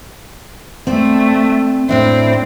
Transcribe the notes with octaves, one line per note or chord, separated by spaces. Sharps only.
A3 C4 D5
A2 C4 D4 E4